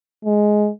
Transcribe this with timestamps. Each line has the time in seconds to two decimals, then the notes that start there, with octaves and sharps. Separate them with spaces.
0.25 G#3